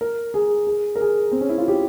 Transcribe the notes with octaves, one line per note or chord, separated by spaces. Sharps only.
A#4
G#4
G#4
A#4
G#4
C4
C#4
E4
F4
G4